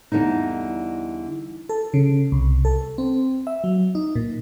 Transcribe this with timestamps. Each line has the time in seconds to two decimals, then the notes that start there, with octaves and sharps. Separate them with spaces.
0.12 E2 D3 G3 D#4
1.69 A4
1.94 C#3
2.32 C2
2.65 A4
2.98 C4
3.47 E5
3.64 F#3
3.95 D#4
4.15 A#2